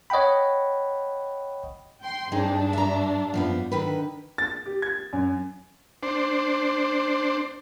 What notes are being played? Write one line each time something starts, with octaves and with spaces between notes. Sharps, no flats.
C#5 D#5 F#5 G5 B5
G5 C6
G2 C4 D4 D#4 G#4
E5 A#5
F#2 F3 B3
D3 D#3 B4
A6
G4
G#6
F#2
D4 C5